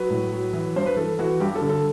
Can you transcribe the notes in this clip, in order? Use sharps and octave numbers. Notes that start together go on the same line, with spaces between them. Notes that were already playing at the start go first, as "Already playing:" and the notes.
Already playing: F#3 B4
A2
F#3
E3
G2 C5
B4
E3 A4
E3 F#4
G2 G4
A4
D3
A4